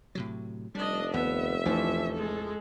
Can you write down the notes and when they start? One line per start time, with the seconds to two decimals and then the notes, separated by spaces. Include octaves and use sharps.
0.15 A2 C3 F#3
0.75 F1 G3 D4 D#5
1.14 D#2 B3 E5
1.65 A1 E2 E3 F3 A3 D4
2.13 G#3 A4